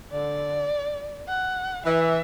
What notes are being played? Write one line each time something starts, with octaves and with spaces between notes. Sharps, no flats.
D3 D5
F#5
E3 E5